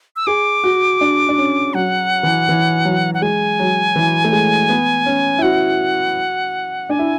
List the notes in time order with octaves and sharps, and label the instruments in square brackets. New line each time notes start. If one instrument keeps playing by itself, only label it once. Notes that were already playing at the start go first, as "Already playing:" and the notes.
[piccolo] E6
[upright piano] G#4 [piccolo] D6
[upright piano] F#4
D4
D4
C#4
[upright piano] F#3 [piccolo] F#5
[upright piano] E3
E3
F#3
[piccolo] F#5
[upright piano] G#3 [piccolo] G#5
[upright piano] F#3
E3
A3
G#3
B3
C#4
E4
[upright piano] F#4 [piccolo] F#5
[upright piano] D4 [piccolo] G#5
[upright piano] E4